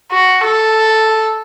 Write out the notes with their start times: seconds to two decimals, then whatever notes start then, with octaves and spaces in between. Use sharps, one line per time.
0.12 F#4
0.45 A4